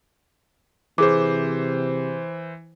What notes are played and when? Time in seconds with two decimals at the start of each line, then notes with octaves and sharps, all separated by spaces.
0.98 C3 E3 G#4 C5 D6